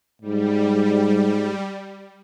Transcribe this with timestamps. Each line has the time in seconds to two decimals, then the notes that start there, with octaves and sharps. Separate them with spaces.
0.22 G#2 G3